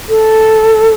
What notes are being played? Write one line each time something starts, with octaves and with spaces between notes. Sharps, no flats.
A4